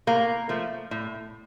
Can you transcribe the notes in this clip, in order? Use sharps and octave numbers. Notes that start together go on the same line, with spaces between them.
A2 A#3
F3 A3
A2